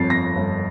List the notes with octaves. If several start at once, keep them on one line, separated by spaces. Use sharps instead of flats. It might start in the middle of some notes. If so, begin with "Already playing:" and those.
Already playing: G1 F2 A6 C7
F2 A#6
G1